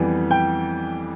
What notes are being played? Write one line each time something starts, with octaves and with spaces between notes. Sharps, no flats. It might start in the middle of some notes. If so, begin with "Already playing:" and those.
Already playing: F2 E3 G3 B3
G5